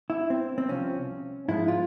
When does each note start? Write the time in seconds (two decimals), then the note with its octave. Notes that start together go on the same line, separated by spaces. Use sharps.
0.10 E4
0.30 C4
0.58 C4
0.69 C2 C3 F3 C#4
1.48 G#2 F3 G#3 E4
1.68 F4